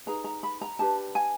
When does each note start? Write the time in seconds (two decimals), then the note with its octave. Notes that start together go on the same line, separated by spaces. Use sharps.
0.06 D#4 G#4 B4 A#5
0.24 A#5
0.43 B5
0.61 A#5
0.79 D4 G4 B4 A5
1.15 G#5